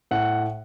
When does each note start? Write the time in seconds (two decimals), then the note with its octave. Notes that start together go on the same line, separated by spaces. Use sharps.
0.11 A2 F#5